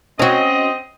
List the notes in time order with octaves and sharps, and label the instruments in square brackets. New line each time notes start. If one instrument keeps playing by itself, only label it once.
[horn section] C4 D#5 [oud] C#4 F#4